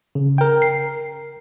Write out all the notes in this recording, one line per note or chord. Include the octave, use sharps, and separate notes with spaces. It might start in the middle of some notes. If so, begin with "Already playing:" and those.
C#3
A#4 G5
C7